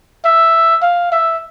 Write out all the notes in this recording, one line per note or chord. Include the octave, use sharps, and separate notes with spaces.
E5
F5
E5